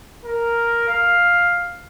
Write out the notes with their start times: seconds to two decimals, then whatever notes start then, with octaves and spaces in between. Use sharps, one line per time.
0.24 A#4
0.88 F5